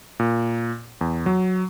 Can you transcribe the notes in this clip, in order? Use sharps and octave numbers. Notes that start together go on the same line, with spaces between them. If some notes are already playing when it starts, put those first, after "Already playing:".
A#2
E2
F#3